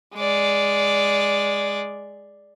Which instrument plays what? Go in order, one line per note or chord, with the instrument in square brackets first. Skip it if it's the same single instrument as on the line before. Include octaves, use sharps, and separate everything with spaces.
[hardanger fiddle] G#3 D5